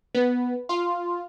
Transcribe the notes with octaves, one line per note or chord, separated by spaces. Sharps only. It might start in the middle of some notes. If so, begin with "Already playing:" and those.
B3
F4